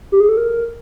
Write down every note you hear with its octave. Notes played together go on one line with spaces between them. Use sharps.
G4
G#4
A4
A#4